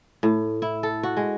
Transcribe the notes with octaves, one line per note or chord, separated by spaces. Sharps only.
A2
E4
A4
F#4
G#3